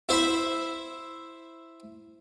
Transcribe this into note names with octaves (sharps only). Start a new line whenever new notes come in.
E4 C5 E5 B5